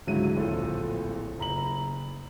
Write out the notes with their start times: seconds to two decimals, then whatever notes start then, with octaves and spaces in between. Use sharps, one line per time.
0.07 C#2 G#2 D3 F#3 E4 D#7
0.36 D1 A#1 A2 A4
1.38 F#1 A#5 B5 F#7